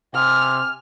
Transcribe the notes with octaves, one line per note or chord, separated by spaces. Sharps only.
C3 G#5 F6